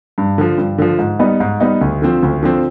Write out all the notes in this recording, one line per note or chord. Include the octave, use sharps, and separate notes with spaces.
G2
D3 F3
G2
D3 F3
G#2
G3 B3 D#4
G#2
G3 B3 D#4
D2
D3 F3 C4
D2
D3 F3 C4